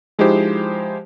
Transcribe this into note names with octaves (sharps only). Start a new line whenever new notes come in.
F3 G#3 D#4 E4 G4 C5